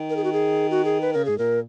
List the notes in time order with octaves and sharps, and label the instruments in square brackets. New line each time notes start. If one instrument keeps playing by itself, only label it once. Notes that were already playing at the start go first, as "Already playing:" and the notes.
Already playing: [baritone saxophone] D#3
[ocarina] A#4
G#4
F#4
G#4
F#4
G#4
B4
[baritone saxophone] C#3 [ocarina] A#4
[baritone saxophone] G#2 [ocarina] G#4
[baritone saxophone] A#2 [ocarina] A#4